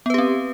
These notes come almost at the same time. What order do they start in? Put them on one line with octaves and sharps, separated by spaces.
B3 B4 G4 C4